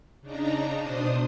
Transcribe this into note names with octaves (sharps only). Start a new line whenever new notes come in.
C#3 D4 D#4 A#5
B2 D4 C5 D#6